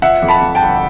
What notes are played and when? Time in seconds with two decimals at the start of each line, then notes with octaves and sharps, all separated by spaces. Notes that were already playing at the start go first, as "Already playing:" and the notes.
0.02 F3 E5 F#5
0.23 F2
0.29 A5 B5
0.42 F2
0.55 G5 A5
0.62 G1